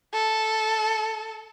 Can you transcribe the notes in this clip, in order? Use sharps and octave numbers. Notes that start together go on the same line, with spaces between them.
A4